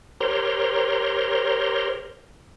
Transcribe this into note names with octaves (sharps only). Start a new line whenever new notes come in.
G4 A#4 C5 C#5 A#5 C6